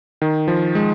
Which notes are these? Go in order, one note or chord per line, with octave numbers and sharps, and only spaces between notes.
D#3
F3
G#3